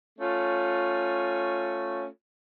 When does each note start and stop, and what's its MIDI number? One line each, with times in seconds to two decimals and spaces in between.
0.19 2.07 57
0.19 2.07 61
0.19 2.07 65